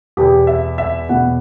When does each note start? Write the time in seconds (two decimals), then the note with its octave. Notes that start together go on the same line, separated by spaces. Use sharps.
0.17 E2 B2 G4
0.47 E5
0.78 E5
1.09 E2 B2 F#5